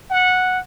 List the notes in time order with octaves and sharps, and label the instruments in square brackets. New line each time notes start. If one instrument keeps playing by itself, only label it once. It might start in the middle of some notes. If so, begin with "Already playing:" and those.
[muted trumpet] F#5